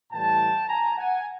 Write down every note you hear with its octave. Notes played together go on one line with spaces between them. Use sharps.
A2 E3 G3 G5 A5
G#5 A#5
F#5 G#5